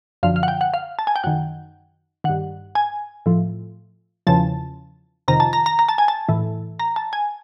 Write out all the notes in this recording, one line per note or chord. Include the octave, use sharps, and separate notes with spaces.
F#2 D3 F3 F5
F5
F#5
G5
F#5
F5
A5
G#5
G5
F#2 D#3 F#5
G2 D#3 F#5
G#5
A2 F3
E2 C#3 F3 A5
F2 C3 D#3 A#5
A5
A#5
A#5
A#5
A5
G#5
A5
A2 E3
A#5
A5
G#5